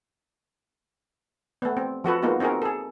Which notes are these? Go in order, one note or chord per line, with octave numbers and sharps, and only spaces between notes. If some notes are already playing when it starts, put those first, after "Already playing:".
A3 B3
C4
F3 F#4 A4 B4
G#3 A#3 B3 D#4 F4 F#4
C4 D#4 F#4 G#4 A#4
G#4 A4